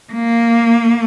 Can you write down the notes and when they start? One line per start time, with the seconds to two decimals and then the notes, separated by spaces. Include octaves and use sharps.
0.13 A#3